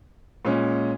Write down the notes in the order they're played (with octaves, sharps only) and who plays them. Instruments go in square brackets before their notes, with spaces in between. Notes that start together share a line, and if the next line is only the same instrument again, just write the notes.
[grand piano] A#2 G#3 C#4